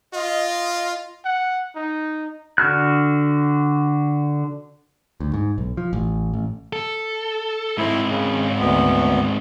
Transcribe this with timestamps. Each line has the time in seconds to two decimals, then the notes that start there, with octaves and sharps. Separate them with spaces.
0.14 F4 D#5
1.25 F#5
1.75 D#4
2.58 D3 F#4 F6 F#6
5.20 D2
5.34 G#2
5.58 B1
5.77 F3
5.93 A1
6.34 A1
6.73 A4
7.78 G#2 C4 E4
8.10 C#3
8.59 D2 B3